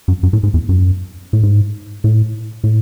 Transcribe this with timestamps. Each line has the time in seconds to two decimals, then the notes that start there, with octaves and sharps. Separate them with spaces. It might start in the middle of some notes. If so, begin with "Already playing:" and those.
0.08 F#2
0.23 F#2
0.33 A2
0.43 G#2
0.54 E2
0.69 F#2
1.33 A2
1.43 G#2
2.04 A2
2.64 A2